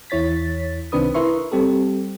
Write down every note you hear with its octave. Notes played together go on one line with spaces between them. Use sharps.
E2 E4 C#5 A6 B6
C2 D#3 C4 D4 B4 D#6
E4 A#4 B4 E5 C6 C#6
G3 C4 G4 A4